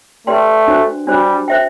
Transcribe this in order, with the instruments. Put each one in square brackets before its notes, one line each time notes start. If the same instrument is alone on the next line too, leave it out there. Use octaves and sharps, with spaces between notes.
[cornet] A3 [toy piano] G4 B4 D5 G5 C6
[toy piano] D4 F#4 C5
[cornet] G3 [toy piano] D4 F#4 C5
[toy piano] C5 E5 G5